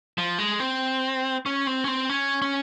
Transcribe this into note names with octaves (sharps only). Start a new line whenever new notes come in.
F3
G#3
C4
C#4
C4
C#4
C4
C#4
C#4